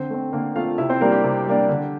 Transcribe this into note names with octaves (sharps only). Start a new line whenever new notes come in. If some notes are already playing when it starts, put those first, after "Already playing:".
Already playing: D3 C4 C5
A3 C4
D3 A#3 A#4
A3 C4 F4 F5
C3 E4 E5
C4 C5
G3 A#3 D4 A#4
G4
C3
G3 A#3 D4
D3